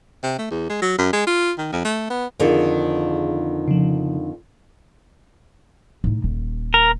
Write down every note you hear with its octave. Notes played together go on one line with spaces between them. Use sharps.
C3
A3
E2
G#3
F#3
F#2
G#3
F4
D#3
F2
A3
B3
F2 D3 D#3 G#4
C#3 F3
A2 D#4
D#1
A#4